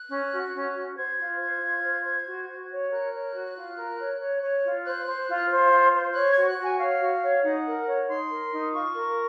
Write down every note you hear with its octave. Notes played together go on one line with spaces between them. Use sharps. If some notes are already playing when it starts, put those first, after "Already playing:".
Already playing: F#6
C#4
F#4
C#4
F#4
C5 G#6
F4
C5
F4
C5
C5
F#4
F#4
C#5
A#4 F#6
C#5
F#4
F4
A#4
C#5
C#5
C#5
F4
C5 F#6
C5
F4
C5
F4
C5
C#5 F#6
G#6
F#4
F#6
F#4 G#5
C#5 F5
F#4
C#5
D#4 F#5
A#4
C#5
D#4 C6
A#4
D#4
F4 C#6
A#4